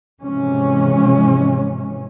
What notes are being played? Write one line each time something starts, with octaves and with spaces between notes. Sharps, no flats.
G#2 C3 E3 F3 G#3 C#4